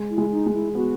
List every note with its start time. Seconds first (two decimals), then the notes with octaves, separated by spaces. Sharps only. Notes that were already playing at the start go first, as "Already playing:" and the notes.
Already playing: G#3
0.10 E4
0.18 G#3
0.32 D#4
0.47 G#3
0.54 E4
0.75 B3 F#4